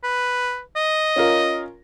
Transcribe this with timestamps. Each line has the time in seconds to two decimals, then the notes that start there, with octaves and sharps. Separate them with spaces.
0.04 B4
0.77 D#5
1.16 C#4 F4 A#4